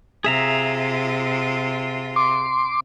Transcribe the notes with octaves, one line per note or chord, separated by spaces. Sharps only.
C3 F4 G#4 E5 A#5
C6 D6